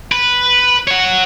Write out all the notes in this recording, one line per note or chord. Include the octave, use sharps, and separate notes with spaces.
B4
C#5 F#5